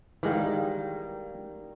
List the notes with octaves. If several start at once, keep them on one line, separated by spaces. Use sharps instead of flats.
D#3 E3 G3 G#3 A#3